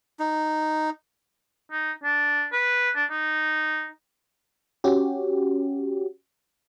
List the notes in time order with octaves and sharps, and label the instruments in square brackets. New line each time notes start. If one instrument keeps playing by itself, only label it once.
[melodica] D#4
[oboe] D#4
D4
B4
D4
D#4
[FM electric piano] C#4 F#4 G4